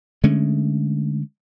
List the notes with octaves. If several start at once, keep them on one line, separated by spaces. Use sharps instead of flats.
D3 G#3 A3 C#4